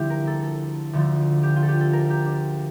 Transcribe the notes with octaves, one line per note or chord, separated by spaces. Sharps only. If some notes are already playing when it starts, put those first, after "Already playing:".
Already playing: D2 D3 F3 G3 C4 D4 E4 G4
A#4
A4
A4
D2 D3 F3
G4
F4
A4
G4
A4
A#4
G4
D4